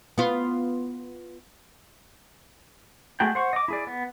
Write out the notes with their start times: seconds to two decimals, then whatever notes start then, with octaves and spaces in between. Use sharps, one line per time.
0.18 B3 F4
3.20 G#3 A3 F#4 G#4 G5
3.35 C5 F#5 C#6
3.53 D#5 D6
3.68 E4 G#4 D5
3.87 B3